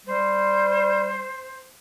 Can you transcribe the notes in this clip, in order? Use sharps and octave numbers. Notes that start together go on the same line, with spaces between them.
G3 C5